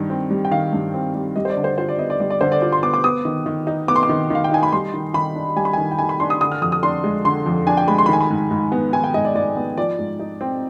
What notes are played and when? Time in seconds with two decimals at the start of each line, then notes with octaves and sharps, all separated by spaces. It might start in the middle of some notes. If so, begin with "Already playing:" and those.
Already playing: G2 D#3
0.10 C4
0.30 G3
0.45 G5
0.51 D#3 F5
0.73 G2
0.94 C4
1.15 G3
1.36 G3 D#5
1.45 C5
1.50 D5
1.57 D3
1.64 C5
1.78 F4 C5
1.89 D5
1.98 B3 D#5
2.10 D5
2.20 G3 D5
2.30 D5
2.41 D3 C5
2.52 D5
2.62 F4 D5
2.72 C6
2.83 B3 D6
2.94 D6
3.04 B3 D#6
3.25 D#3
3.46 D#3
3.67 D#4
3.88 B3 D6
3.96 C6
4.03 D6
4.09 D#3
4.30 D#3 F5
4.44 G5
4.51 D#4 G#5
4.63 B5
4.72 G3 C6
4.94 D#3
5.14 D#3 B5
5.35 D4
5.56 G3 G#5
5.65 B5
5.73 D#3 G#5
5.91 G5
5.98 D#3 G#5
6.09 B5
6.20 D4 C6
6.30 D#6
6.41 D3 D#6
6.52 F6
6.62 F2 D#6
6.72 D#6
6.83 D4 C6
7.04 G#3
7.25 D3 C6
7.46 F2
7.67 D4 G#5
7.77 G5
7.88 G#3 B5
7.98 C6
8.06 B5
8.09 D#3 G#5
8.21 B5
8.30 G#2
8.51 G#2
8.72 B3
8.93 D#3 G#5
9.04 G5
9.14 G#2 D#5
9.25 D5
9.35 G#2 D5
9.56 B3
9.77 F3 D5
9.99 G#2
10.19 D#4
10.41 C4